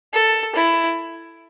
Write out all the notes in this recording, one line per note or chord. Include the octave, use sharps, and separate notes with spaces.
A4
E4